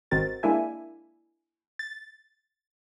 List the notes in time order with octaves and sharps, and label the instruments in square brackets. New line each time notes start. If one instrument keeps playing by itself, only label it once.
[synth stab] G#1 D#3 C4 F#4 A#4 A6
G#3 A#3 D4 E4 E5 G#5
A6